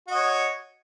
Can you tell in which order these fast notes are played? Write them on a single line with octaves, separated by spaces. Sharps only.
F#4 D#5 C#5